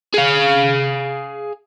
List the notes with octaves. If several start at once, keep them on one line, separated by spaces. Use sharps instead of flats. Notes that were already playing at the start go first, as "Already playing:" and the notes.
G#4 F5